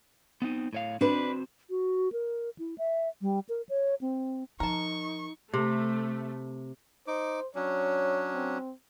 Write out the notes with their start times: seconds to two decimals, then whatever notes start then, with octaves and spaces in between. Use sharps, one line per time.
0.42 B3 C4 D#4
0.73 A2 C#5 F5
1.01 C4 D4 F#4 B4 C5
1.70 F#4
2.12 A#4
2.59 E4
2.78 E5
3.22 G3
3.49 A#4
3.69 C#5
4.01 C4
4.60 F3 D#4 A#4 A5 C#6
5.54 C3 A3
7.07 D#4 C5 D6
7.55 F#3 C#4 D4 C#5
8.33 C4